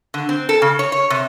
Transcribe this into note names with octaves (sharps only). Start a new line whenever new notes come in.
D3
C4
A4
C#3
C#5
C#5
C3